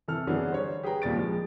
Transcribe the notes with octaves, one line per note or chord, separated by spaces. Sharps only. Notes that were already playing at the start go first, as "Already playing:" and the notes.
C3 E3 A4 F6
D3 E3 F#3 B3 G#4
G3 C5 C#5
G4 G#4 B4 G5 A#5
D#2 A#2 G3 A6 D7
F3 G#3